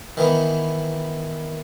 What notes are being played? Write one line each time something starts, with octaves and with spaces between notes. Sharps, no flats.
D#3 E3 B3